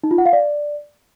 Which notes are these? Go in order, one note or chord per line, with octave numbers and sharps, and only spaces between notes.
D#4
F4
F#5
F5
D5